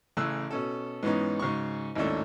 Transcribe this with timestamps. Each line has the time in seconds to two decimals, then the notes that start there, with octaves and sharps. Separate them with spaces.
0.17 A1 C#3 A3 E6 F#6
0.51 B2 C#4 A4
1.03 G#2 E3 B3 C#4 D#4
1.39 G#2 C#3 F#4 C#6
1.95 G#1 D#2 A2 C#4 D4 A4